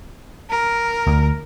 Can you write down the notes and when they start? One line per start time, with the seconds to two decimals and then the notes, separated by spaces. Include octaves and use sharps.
0.50 A#4
1.07 D2